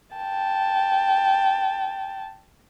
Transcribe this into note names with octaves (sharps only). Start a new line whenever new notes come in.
G5 A5